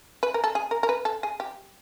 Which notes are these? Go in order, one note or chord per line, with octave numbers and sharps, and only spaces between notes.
B4
A#4
A4
G#4
A#4
A#4
B4
A4
G#4
G4